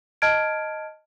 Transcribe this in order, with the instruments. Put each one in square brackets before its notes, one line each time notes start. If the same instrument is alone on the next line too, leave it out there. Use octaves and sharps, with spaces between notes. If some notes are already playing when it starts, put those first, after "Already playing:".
[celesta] D#5 A5 F6 G#6 D7